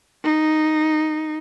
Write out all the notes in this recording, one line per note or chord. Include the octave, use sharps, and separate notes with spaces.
D#4